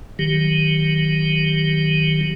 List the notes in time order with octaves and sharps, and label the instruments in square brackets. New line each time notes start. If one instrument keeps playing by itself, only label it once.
[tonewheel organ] D#3 F#3 G4